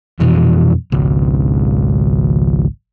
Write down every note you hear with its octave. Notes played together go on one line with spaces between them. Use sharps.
F2 B2 E3
G#1 C#2